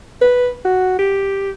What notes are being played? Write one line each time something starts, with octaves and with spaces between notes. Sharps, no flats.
B4
F#4
G4